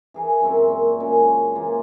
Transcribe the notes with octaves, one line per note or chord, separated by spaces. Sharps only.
E3 G#4 A#4
F#2 G#3 C4 E4
A#2 C#6
F#2 C#3 G#3
E3 A#3 F4